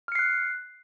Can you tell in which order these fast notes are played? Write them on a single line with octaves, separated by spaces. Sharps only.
F6 C#7 C7 F#6